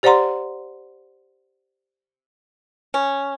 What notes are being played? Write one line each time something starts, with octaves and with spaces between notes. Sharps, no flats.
G4 C5 D5 F#5 A#5 C6
C#4